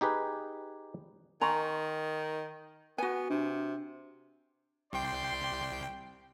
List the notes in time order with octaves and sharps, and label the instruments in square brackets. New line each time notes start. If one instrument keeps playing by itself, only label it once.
[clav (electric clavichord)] D#4 G4 G#4 B4
[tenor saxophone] D#3 [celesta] G#5 C6 C#6 [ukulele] A#5
[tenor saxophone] B3 [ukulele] F#4 G#5
[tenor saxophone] C3 [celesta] D4
[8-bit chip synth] C2 G5 [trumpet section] G4 D5 C6